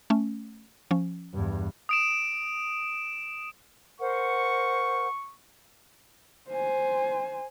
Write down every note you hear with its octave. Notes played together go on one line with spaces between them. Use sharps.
A3 C#4
F3 C#4
E2 G2
D#6 D7 E7
A#4 C5 F#5 C#6
C5 G#5